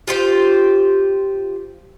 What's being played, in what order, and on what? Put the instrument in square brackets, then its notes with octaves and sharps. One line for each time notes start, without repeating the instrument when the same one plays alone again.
[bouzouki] F4 G4 C5